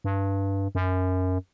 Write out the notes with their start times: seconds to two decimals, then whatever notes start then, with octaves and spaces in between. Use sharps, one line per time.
0.04 G2
0.75 F#2